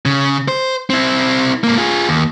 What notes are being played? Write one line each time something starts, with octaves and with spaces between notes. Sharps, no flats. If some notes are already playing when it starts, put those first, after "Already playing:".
C#3
C5
C4 E4
G#2 A#3
F4 G#4
D#2